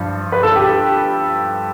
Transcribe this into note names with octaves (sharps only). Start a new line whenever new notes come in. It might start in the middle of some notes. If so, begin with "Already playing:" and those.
Already playing: G2 F3
B4
A4
G4